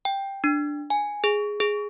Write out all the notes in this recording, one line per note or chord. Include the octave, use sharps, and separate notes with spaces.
G5
D4
G#5
G#4
G#4